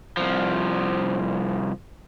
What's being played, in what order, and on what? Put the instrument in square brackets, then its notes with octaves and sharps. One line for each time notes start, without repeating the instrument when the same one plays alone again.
[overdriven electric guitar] C2 F3